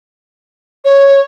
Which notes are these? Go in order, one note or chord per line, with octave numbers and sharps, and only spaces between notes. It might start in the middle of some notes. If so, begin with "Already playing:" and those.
C#5